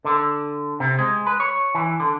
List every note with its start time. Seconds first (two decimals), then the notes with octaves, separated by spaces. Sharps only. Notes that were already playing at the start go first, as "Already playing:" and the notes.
0.05 D3
0.80 C3
0.99 G#3
1.26 B4
1.40 C#5
1.75 E3
2.00 D3